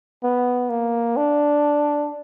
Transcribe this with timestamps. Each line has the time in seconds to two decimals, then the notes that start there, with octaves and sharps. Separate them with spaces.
0.23 B3
0.70 A#3
1.17 D4